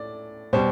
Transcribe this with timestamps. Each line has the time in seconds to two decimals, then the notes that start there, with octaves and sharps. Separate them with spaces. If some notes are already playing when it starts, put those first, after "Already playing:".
Already playing: A2 D5
0.53 B2 G3 C5